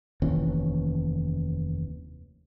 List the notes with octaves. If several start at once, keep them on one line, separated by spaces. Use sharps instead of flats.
F1 D#2 E3 C#4